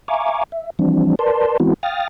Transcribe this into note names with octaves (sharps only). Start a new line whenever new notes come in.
E5 F5 G#5 A#5 C#6 D6
E5
E3 F3 G3 C4 D4
A#4 B4 D5 A5 C6
E3 G#3 B3 C4 E4 F#4
F5 G5 D#6 F6 A6 A#6